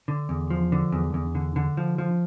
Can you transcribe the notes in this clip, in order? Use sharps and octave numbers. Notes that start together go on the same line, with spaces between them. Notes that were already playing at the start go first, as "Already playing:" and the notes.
D3
E2
F3
D3
E2
E2
D3
D3
F3
F3